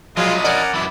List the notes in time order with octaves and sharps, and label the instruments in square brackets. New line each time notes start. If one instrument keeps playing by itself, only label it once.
[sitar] A#2 F3 [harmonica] G#3 F4 [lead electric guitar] E4 D#5
[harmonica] C#4 A#4 F#5 [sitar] D5
[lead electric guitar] F#2 E3 [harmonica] E4